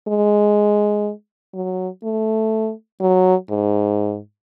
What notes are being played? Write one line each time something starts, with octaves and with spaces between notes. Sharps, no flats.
G#3
F#3
A3
F#3
G#2